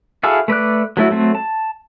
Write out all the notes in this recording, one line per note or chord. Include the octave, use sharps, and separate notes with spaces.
E4 F#4 G#4 A4 F5
A3 B4 D5 F#6
F#3 A3 E4 F#4
F#3 A3 C4
A5